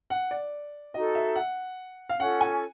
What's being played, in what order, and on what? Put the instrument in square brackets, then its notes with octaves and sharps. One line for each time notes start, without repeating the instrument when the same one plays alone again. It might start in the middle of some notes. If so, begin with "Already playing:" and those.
[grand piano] F#5
D5
[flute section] D#4 F#4 A4 [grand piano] D#5
[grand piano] E5
F#5
F5
[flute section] C#4 F4 A4 [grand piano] F#5
[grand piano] G#5